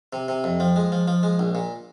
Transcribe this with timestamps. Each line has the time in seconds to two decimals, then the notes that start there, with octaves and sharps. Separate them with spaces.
0.13 C3
0.28 C3
0.44 F2
0.60 F3
0.76 G#3
0.92 F3
1.08 F3
1.23 G#3
1.39 A#1
1.55 A#2